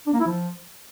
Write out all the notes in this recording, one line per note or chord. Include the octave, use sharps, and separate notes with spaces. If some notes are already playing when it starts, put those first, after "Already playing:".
D4
A#3
E4
F3